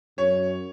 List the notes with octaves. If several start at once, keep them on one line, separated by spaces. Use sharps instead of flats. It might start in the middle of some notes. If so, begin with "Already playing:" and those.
F#2 C#5